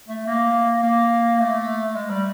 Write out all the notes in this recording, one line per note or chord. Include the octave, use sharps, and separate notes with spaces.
A3
A#3
A#3
A3
G#3
G3